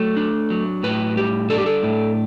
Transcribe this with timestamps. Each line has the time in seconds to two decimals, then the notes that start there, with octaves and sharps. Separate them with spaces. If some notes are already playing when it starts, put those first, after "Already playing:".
Already playing: F#3 A3 C#5
0.17 D4
0.50 F#3
0.83 A2 B4
1.16 G3 G4
1.50 D4 A4
1.58 G4
1.66 A4
1.83 A2